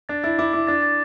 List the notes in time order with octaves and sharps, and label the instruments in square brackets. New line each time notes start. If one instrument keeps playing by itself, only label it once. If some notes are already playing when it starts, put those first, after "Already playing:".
[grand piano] D4 [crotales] A6
[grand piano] E4 [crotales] A6
[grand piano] E4 [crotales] D6
[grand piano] E4 [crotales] D6
[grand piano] D4 [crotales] A6
[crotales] A6